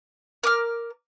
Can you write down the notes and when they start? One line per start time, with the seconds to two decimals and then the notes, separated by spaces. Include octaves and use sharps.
0.44 A#4 D6 F6